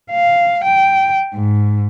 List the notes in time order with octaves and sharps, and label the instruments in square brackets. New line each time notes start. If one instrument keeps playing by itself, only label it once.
[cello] F5
G5
G#2